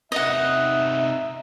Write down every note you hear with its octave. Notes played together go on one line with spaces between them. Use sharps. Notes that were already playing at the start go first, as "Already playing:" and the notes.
C3 D#4 D#5 E5 F#5